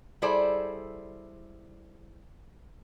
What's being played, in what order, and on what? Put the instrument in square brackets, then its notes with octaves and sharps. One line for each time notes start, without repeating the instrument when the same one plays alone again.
[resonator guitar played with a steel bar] G3 E4 G#4 A4 C5 D5